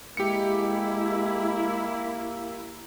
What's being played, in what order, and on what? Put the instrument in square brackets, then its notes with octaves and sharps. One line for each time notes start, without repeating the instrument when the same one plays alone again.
[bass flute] G#3 [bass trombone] A#3 [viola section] E4 [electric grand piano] G4 C#7